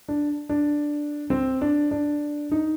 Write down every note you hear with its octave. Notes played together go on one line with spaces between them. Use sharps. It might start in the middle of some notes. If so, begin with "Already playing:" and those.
D4
D4
C4
D4
D4
D#4